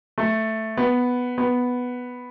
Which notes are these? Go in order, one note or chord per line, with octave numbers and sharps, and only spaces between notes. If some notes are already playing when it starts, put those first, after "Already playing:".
A3
B3
B3